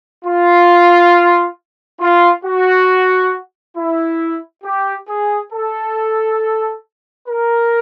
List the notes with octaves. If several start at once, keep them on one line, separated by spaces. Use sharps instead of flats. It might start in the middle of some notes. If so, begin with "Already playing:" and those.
F4
F4
F#4
E4
G4
G#4
A4
A#4